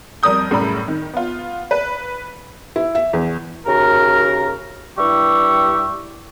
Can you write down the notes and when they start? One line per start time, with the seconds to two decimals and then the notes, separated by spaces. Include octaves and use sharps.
0.23 F2 G3 A#4 D#6 G6
0.50 F#2 A2 C#3 G3 A#4 B5
0.88 D#3
1.13 B3 F4
1.71 B4
2.76 E4
2.95 E5
3.13 E2
3.66 D#2 C#3 F#4 A#4
4.98 G2 G3 E4 G4 E5 C#6